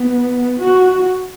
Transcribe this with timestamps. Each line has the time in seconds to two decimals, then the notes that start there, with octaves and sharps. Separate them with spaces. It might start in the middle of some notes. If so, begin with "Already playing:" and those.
Already playing: B3
0.59 F#4